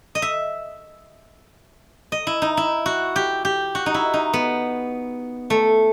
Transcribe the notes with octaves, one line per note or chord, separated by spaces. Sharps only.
D#5
E5
D#5
E4
D#4
E4
F#4
G4
G4
F#4
D#4
E4
D#4
B3
A3